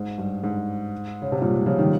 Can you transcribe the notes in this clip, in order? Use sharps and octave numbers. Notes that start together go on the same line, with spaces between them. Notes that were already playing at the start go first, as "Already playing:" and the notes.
Already playing: G#2
G2
G#2
C#3
C3
G2 A#2
G#2
C#3 F3
D#3 G3